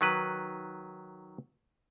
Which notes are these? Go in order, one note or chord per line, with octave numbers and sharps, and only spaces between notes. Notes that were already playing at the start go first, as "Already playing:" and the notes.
D#3 F#3 B4